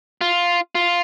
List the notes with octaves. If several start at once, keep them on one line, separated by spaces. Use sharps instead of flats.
F4
F4